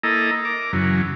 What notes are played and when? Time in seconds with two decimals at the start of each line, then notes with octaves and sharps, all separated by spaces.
0.03 A#3 E4 A4 D#5 A#5
0.45 A#4 D6
0.73 F#2 C#3 E3 F#3